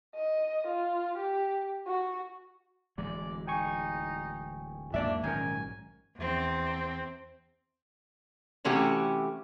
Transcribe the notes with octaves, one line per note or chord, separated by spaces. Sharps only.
D#5
F4
G4
F#4
D1 E3 G#3 D5
D#4 G5 G#5 C#6
E2 G#2 F#3 A#3 D4 D5 E5
A#1 G#2 D#3 F#3 C#4 A#4 G#5
E2 C4
C3 E3 A3 C#4 F#4 G4